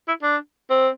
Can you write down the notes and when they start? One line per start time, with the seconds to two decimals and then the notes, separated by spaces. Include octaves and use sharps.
0.08 E4
0.23 D4
0.70 C4